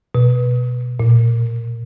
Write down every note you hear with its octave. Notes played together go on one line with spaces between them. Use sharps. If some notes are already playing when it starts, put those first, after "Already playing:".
B2
A#2